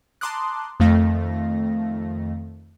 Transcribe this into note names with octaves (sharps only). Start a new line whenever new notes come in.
A5 A#5 C6 D6 D#6 F#6
F2 D#3 A3 F5 A#6